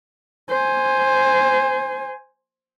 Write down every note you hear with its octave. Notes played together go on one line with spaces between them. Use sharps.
C5 G#5